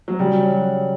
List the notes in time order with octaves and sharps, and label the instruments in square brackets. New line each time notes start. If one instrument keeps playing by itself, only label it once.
[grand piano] F#3
[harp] C#3 [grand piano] G3
[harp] F#3